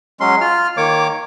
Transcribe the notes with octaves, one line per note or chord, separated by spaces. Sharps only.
F#3 G#3 C#4 C6
F4 F6
D#3 A#3 C#5 D6